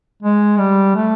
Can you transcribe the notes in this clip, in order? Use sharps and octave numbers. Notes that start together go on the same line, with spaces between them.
G#3
G3
A3